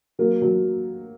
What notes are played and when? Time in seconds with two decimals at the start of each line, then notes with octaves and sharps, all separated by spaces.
0.19 F#3 A#3
0.42 F#3